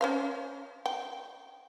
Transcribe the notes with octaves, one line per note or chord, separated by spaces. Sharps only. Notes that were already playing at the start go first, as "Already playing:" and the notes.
C#4 C5 F5
G5